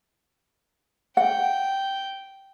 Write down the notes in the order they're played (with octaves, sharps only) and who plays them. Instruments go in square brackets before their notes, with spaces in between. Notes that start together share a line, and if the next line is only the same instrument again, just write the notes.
[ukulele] F#5 [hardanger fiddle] G5